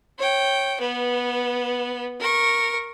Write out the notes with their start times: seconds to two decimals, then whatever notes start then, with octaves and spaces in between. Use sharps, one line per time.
0.19 C#5 G5
0.80 B3 B4
2.20 A#4 C#6